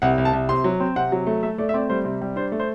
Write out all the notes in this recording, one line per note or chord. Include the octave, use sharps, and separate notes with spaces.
C2 F#5
C2
A5
C2
C3 C6
F#3
C4
C3 F#5
F#3
A3
A3 E5
A3 D5
E5
C4 D5
G3 C5
C3
G3
D4 C5
A3
C5